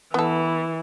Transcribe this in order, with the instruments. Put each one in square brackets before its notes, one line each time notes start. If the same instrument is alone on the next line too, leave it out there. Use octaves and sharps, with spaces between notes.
[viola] E3 [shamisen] B3 A4